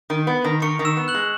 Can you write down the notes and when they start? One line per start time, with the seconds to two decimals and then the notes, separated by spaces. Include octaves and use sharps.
0.10 D#3
0.27 B3
0.44 D#3
0.62 D#3 C#6 C#7
0.79 D#3
0.85 E6 E7
0.97 B3
1.08 F#6 F#7
1.14 G#3